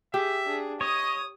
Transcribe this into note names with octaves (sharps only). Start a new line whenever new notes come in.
G4 G#4 E5
D4 G#4
C#5 D#5 D#6